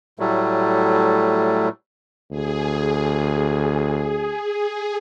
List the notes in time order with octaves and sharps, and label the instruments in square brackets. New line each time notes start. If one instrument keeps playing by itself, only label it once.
[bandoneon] A2 F#3 G3 A3
[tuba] D2 [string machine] G#4